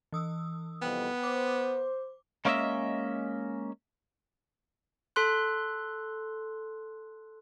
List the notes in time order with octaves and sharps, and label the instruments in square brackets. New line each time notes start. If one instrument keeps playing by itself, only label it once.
[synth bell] E3 D#6 E6
[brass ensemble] C2 F2 [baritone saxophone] B3 [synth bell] G5
[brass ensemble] C5 [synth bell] D6
[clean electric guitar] G#3 A#3 C#4 C#5 D#5 E5
[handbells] A4 C6 F#6